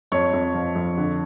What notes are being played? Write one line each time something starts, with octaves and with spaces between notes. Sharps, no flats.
F2 C#5
F2
F3
F2
D3